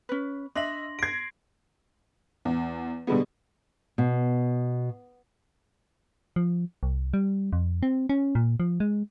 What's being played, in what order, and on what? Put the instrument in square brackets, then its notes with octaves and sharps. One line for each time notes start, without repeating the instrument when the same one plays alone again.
[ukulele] C#4 B4
[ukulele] D4 [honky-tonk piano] D#5 E5 [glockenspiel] C6 A#6 F#7
[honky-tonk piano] G#6 A#6 [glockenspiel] C7 D7
[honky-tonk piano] E2
B2 D3 G3 G#3 B3
[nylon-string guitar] B2
[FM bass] F3
C2
G3
F2
C4
C#4
A#2
F3
G#3